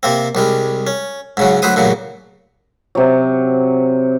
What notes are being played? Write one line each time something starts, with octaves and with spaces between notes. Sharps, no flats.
C3 A#3 C4
C2 G3 G#3
C#4
G#2 C#3 F#3
D2 F#3 B4 C5 D#6
A1 A#2 C#3 F#3
C3 F#3